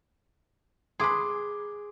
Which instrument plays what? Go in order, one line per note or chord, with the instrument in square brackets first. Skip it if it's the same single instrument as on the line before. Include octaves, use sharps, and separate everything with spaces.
[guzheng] G#4 B4 [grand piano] C6 D6